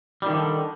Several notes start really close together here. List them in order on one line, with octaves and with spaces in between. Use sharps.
G3 D#3 F3 D3